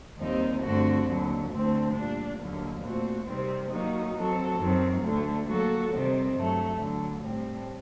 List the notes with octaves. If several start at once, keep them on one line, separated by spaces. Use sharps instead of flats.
D#2 D#3 G3 C4 D#4
G2 D3 A3 C4 F#4
D#2 D3 F#3
D2 D3 A3 C4
A#2 G3 D4
D#2 D3 F#3 A#3
A#2 A3 C4 F#4
C3 D#3 G3 C4
D#3 F#3 A#3 D#4 F#4
F#3 C4 F#4 A4
F#2 D#3 F#3 C4
D2 D3 A3
F#3 A#3 F#4 A4
C3 D#3 G3 C4
G2 F#3 A3
D2 D3 F#3
A2 G3 C4